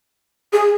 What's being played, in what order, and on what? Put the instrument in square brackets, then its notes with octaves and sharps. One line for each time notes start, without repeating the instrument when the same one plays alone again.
[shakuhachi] G#4